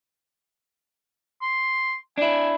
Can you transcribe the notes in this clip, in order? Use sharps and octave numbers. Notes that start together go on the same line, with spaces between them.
C6
D4 E4 G#5